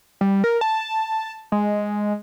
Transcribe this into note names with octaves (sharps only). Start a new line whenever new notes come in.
G3
A#4
A5
G#3